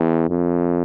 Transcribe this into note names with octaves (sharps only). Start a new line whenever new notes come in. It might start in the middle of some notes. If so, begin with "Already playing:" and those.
Already playing: E2
F2